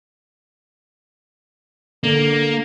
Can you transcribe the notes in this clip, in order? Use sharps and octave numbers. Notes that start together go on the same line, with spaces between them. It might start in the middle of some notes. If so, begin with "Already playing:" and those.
D3 A#3